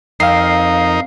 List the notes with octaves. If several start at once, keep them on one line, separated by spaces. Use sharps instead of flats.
F2 D#4 A#4 F5 C7